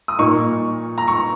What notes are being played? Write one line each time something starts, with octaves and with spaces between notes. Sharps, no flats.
D#6
A#2 A#3 D#4 C#6
A#5
C#6